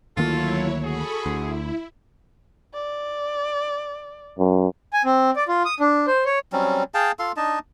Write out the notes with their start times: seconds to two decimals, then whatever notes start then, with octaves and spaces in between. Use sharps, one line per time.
0.17 D2 D#3 F#3 A#3 E4 F4 A4 C#5
0.83 F#4 G#4 A4 B5 C#6
1.26 D2 E4
2.74 D5
4.39 F#2
4.93 G#5
5.05 C4
5.36 D5
5.48 F4
5.65 D#6
5.80 D4
6.07 C5
6.25 C#5
6.52 F#3 G3 C4 C#4
6.94 G#4 F5 G5 A5
7.19 F4 A4 F5 C6
7.36 D4 D#4 D#5 A5